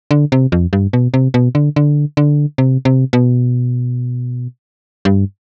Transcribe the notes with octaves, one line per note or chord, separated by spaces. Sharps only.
D3
C3
F2
G2
B2
C3
B2
D3
D3
D3
C3
C3
B2
G2